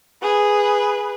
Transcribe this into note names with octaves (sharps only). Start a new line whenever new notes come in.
G#4 B4